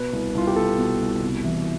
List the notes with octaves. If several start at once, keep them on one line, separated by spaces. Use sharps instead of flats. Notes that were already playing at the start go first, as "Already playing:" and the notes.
Already playing: B2 B4
C2
C2 F4
G4
B2 A4
B2
C2
C3
E3